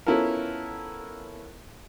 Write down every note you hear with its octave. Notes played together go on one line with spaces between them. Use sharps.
B3 C#4 E4 F4 A4 A#4